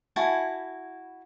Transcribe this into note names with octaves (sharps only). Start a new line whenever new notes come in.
E4 F#4 G#5 A5